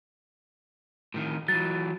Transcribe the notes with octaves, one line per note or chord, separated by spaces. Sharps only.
A2 D#3
E3 F#3 A6